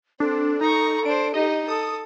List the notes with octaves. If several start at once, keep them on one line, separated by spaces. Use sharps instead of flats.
C4 D4 A4
D#4 A#5 C#6
D4 C5 D7
D#4 G4 D#5
A4 D#6